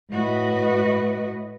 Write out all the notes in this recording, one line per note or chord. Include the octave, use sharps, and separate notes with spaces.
A2 F#4 B4 D#5